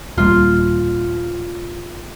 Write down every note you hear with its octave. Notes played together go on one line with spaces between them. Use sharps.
D#1 G3 A#3 F4